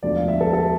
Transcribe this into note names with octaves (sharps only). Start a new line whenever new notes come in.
E1 D2 D3 F3 D5
F5
E5
A4
A4